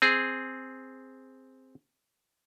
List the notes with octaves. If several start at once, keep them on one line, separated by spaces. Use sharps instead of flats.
C4 G#4